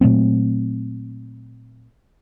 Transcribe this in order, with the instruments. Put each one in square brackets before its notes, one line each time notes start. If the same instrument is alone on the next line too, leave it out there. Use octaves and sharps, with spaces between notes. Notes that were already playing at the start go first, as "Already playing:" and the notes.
[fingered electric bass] A#2 F#3 A3 C4